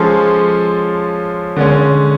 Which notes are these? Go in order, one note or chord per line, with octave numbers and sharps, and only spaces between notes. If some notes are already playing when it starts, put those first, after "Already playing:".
Already playing: F3 G#3 C#4 F4 A4
D3 G#3 C#4